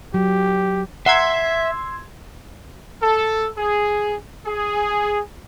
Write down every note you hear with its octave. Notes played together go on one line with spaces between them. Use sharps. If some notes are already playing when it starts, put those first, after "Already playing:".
F#3 G4
E5 F#5 A#5 C6 E6 G#6
A4
G#4
G#4